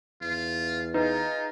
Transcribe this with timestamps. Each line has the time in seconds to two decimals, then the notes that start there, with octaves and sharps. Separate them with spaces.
0.22 E2 F4
0.94 D#4 F4 G#4 B4